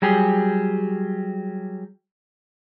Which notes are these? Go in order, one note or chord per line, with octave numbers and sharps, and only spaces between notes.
F#3 G3 G4 G#4